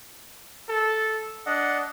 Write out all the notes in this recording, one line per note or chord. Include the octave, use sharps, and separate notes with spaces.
A4
D4 D#5 F#5